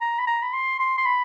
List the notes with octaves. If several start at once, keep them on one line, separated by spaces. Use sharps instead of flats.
A#5
B5
A#5
B5
C6
C6
C6
B5